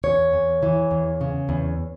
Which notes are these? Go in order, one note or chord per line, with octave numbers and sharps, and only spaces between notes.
E2 C#5
E2
E3
E2
C#3
E2